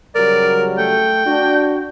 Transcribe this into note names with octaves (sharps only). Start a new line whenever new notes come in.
C#3 F#3 G3 A#4 D5
A3 G5
D4 F#4